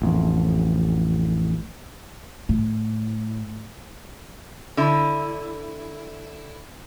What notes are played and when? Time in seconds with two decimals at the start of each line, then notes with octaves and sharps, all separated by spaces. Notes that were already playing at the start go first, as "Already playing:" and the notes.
0.02 A1 F2
2.49 A2
4.77 D3 E4